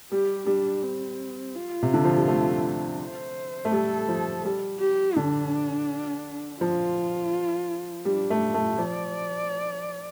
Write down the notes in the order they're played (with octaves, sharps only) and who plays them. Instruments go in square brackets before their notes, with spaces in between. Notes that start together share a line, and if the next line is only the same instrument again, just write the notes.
[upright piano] G3 [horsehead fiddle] G4
[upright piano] G3 [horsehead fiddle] D4
[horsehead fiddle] C4
F4
[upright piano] C3
D3
F3
G3
A3
[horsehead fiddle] C5
[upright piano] A3
[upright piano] G3 [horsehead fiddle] A4
[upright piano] F3
G3
[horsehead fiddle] G4
[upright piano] D3 [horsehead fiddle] D4
[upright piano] F3 [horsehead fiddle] F4
[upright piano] G3 [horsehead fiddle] D4
[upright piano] A3
[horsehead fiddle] F4
[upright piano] A3
[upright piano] F3 [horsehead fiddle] D5